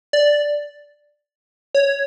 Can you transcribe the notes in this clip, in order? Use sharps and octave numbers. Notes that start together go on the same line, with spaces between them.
D5
C#5